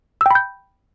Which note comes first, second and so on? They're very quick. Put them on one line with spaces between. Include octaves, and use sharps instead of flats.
E6 G5 B5 G6